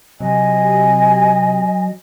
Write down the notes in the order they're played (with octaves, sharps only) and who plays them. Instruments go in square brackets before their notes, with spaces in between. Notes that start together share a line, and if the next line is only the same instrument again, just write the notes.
[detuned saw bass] C3 [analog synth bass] F#3 [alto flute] D#5 [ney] G#5